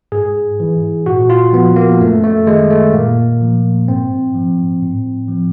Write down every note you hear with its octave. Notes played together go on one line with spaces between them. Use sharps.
G#2 G#4
E3
A#2 F#4
F4
F3 B3
A#3
F#2 A3
A3
D#3 G#3
A3
A#2 A#3
F3
G#2 C4
F3
A2
F3